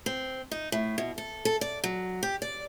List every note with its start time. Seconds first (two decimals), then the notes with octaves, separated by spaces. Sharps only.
0.06 C4
0.51 D#4
0.72 A2
0.98 B2
1.18 A4
1.45 A4
1.61 D5
1.84 F#3
2.23 G4
2.42 D5